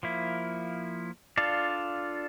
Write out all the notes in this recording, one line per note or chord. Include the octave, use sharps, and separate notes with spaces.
F3 A#3 E4
D4 F4 A4 D5 F5